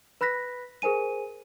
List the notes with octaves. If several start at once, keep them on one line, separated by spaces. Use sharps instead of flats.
B4 B5 F#6 A#6 B6
G#4 A#4 C5 G#5 D#7